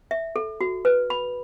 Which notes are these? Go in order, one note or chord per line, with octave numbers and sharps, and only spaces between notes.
E5
A4
F#4
B4
B5